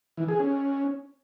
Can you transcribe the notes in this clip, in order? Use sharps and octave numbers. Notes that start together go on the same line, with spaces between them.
E3
G#4
C#4